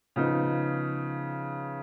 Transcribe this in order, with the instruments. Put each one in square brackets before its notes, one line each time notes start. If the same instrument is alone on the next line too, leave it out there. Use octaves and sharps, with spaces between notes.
[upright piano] C#3 F3 B3 D#4